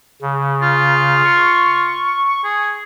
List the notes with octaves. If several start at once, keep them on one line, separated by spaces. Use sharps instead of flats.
C#3
F4
C#6
G#4